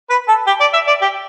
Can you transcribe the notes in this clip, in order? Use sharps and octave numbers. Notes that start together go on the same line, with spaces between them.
B4
A4
G4
D5
E5
D5
G4